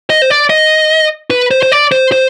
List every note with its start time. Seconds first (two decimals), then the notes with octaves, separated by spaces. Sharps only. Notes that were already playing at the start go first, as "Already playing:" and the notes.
0.10 D#5
0.22 C5
0.30 D5
0.50 D#5
1.31 B4
1.51 C5
1.63 C5
1.72 D5
1.92 C5
2.12 C5